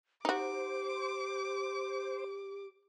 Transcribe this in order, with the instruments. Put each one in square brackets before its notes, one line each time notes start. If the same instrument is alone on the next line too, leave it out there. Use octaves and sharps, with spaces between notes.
[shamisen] D#4 F#4 [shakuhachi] G4 [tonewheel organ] C5 [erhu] D6